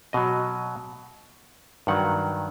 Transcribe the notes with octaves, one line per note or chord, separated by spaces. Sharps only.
B2 F#3 D#5
G2 D#3 F#3 F#5